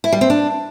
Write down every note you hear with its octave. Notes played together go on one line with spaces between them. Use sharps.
E4
G3
C4
D4